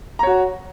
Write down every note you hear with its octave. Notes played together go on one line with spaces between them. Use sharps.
F#4 C#5 A#5